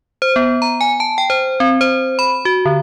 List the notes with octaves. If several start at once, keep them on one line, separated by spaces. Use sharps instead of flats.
C5
B3
A#5
G#5
A5
G5
C5
C4
C5
B5
F#4
D3